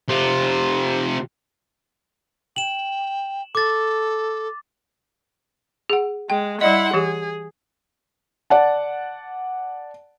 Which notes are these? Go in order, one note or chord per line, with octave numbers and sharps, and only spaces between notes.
C3 F4
G5 E7 F#7
A4 D6 A6
G#4 F#5
G#3 G5
G3 E4 D5 D#5 F#5 C6
E3 G4 G#4
D5 F#5 A5